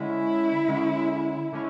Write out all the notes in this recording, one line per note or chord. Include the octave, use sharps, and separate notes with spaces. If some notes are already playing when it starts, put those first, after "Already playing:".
Already playing: D3 G#3 C#4 E4
D3 G#3 C#4
D3 G#3 C#4